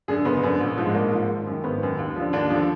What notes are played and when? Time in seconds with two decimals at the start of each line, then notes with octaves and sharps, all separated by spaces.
0.08 F#2 D3 G#4
0.25 F#1 B3
0.43 F#2 D3
0.60 A#1
0.77 G#2 F3
0.86 G#3
0.94 A#1 A#3
1.12 G#2 F3
1.29 G#1
1.47 F#2 D#3
1.64 G#1 B3
1.81 F#2 D#3
1.99 D#2
2.16 D3 F3
2.33 D#2 D4
2.50 D3 F3